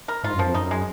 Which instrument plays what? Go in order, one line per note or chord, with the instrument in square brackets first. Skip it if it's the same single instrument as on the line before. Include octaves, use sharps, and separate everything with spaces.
[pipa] A#4
[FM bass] G#2 [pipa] F4
[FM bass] F#2
[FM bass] F2 [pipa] F3
[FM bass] F#2 [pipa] D#4
[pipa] G#3